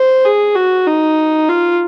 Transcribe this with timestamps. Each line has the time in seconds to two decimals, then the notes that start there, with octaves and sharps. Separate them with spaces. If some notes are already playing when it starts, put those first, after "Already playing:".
Already playing: C5
0.24 G#4
0.55 F#4
0.87 D#4
1.48 F4